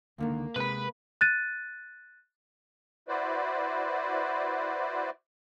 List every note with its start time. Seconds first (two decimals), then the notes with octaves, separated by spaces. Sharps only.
0.18 C#2 D3 D#3 A#3
0.56 C3 G#3 B4 B5
1.21 F#6 A6 D#7
3.08 E4 F#4 B4 C5 D5